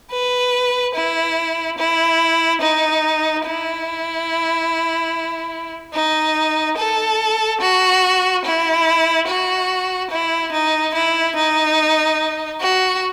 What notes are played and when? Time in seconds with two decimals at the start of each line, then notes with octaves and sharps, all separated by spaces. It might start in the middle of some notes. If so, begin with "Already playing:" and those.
0.11 B4
0.95 E4
1.78 E4
2.62 D#4
3.45 E4
5.94 D#4
6.78 A4
7.61 F#4
8.45 E4
9.27 F#4
10.11 E4
10.52 D#4
10.94 E4
11.36 D#4
12.61 F#4